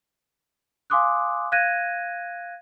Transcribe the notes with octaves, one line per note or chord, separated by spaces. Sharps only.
F5 G#5 C6 D6 D#6 F#6
F5 F#6 G#6 A#6 D#7